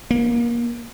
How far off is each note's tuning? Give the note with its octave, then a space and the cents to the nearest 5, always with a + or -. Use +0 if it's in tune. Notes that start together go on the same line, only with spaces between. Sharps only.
A#3 +25